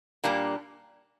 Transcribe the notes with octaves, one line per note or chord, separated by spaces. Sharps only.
A#2 G3 A#3 D4